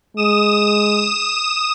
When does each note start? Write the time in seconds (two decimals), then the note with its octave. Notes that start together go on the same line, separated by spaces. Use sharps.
0.17 G#3 D#6 E7